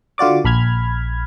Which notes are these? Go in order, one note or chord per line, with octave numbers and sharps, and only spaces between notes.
D3 F4 F#4 D5 D6
A#1 B5 F6 G#6